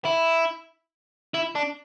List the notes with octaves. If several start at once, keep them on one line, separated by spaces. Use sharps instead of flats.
E4
E4
D4